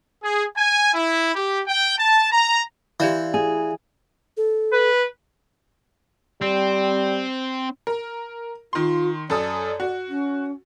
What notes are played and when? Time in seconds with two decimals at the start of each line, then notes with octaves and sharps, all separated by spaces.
0.24 G#4
0.56 G#5
0.94 E4
1.36 G4
1.67 G5
1.98 A5
2.32 A#5
3.00 E3 G4 D5 F5
3.34 E4 G#4
4.37 A4
4.73 B4
6.41 G3 C4
7.87 A#4
8.73 D#3 F4 C6
9.30 F#2 A4 D5 D#6
9.80 F#4
10.08 C#4